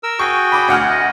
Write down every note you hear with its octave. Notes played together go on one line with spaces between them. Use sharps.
A#4 E6
F#4 G#4 G5 C#6
B5 D6
D2 F#5 F6
D#5